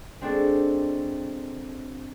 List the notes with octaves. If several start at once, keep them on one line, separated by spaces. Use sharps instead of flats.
G#3 C4 D4 F#4 A4